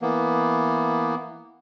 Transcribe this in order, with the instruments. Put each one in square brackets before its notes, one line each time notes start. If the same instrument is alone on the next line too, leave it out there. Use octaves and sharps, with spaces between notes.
[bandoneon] E3 A#3 B3